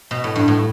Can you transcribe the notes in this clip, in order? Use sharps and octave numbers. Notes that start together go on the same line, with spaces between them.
B2
A2
G2
A2